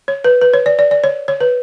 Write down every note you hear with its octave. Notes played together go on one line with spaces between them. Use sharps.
C#5
B4
B4
C#5
D5
D5
D5
C#5
C#5
B4